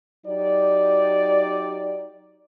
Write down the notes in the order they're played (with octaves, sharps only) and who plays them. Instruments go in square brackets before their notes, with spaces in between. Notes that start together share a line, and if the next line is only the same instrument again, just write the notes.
[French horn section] F#3 D#4 G4 D5